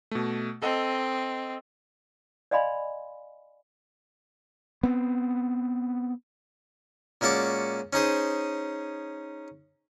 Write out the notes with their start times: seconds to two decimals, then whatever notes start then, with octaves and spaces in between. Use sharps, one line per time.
0.11 B2 A3
0.62 C4 A4 D#5
2.51 D5 D#5 F5 G#5 B5 C6
4.83 B3 C4
7.21 A#2 G#3 C#4 F#4 A5 D6
7.93 C#4 D#4 G#4 C5